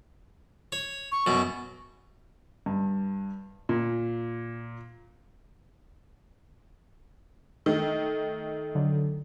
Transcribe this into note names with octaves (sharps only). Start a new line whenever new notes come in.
C#5
C#6
F#2 B2
G2
A#2
D#3 A3
D3 F#3